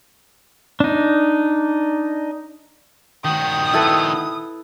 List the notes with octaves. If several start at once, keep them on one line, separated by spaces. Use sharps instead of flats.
D4 D#4
D#3 F#4 G5 D#6
E4 A4 B4